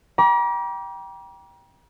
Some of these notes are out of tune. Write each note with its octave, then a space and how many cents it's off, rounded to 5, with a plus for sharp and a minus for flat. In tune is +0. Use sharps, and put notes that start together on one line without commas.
G5 +0 A#5 +40 D6 -20